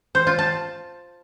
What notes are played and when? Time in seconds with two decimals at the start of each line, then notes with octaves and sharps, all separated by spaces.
0.15 C5
0.27 F4
0.39 A5